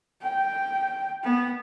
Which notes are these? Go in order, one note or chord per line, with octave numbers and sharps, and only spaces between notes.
G5
B3